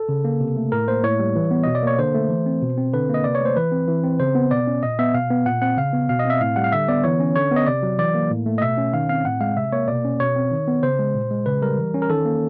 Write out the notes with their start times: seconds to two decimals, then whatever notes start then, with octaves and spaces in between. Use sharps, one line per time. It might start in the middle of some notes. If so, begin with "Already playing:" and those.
Already playing: A4
0.09 C#3
0.25 A#3
0.40 C3
0.56 A3
0.72 A2 A#4
0.88 A#3 C5
1.03 A2 C#5
1.20 G3
1.36 E3
1.51 B3
1.64 B2 D#5
1.75 D5
1.83 A#3 C#5
1.98 D3 C5
2.14 A3
2.30 E3
2.46 C4
2.62 B2
2.77 C4
2.94 D3 B4
3.09 A#3
3.14 D#5
3.24 C3 D5
3.35 C#5
3.41 A3 C5
3.57 E3 B4
3.72 C4
3.88 E3
4.04 C4
4.19 C#3 C5
4.35 B3
4.51 B2 D5
4.67 C#4
4.83 A#2 D#5
4.99 B3 E5
5.14 B2 F5
5.30 B3
5.46 A#2 F#5
5.62 C4 F#5
5.78 C#3 F5
5.93 B3
6.09 B2 F5
6.19 D#5
6.25 C4
6.30 E5
6.41 A2 F5
6.56 G3 F#5
6.64 F5
6.72 D3 E5
6.88 B3 D5
7.04 E3 C#5
7.20 C#4
7.36 D3 C#5
7.51 B3 D#5
7.67 C3 D5
7.83 F#3
7.99 E3 D5
8.15 A#3
8.30 A2
8.46 A3
8.58 D#5
8.62 B2 E5
8.78 C#4
8.93 D#3 F5
9.09 C4 F5
9.25 A2 F#5
9.41 G#3 F5
9.57 C3 E5
9.72 A#3 C#5
9.88 B2 D5
10.05 C#4
10.20 B2 C#5
10.36 C4
10.52 D#3
10.68 B3
10.83 C#3 C5
10.99 G#3
11.14 A#2
11.31 G#3
11.46 C#3 B4
11.62 G3 A#4
11.78 E3
11.94 C#4
12.02 A#4
12.10 D#3 A4
12.25 A#3